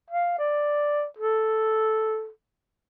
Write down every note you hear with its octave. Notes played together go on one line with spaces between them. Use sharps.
F5
D5
A4